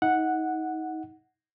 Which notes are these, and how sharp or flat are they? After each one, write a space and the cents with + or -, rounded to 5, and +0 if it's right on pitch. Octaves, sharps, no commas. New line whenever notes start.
D#4 +30 F#5 -5